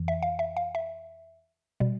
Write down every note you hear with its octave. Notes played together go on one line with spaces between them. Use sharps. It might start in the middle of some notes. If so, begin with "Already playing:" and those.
Already playing: F2 E3
E5
F5
E5
F5
E5
B2 G3